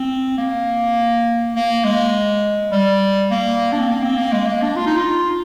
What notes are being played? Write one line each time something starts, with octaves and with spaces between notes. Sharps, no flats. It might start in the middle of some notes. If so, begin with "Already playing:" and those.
Already playing: C4
A#3
A#3
G#3
G3
A#3
D4
C4
A#3
C4
A#3
G#3
A#3
D4
F4
D#4
F4